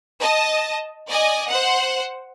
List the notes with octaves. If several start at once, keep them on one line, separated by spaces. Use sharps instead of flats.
D#5 A5
D5 D#5 G#5
C5 F#5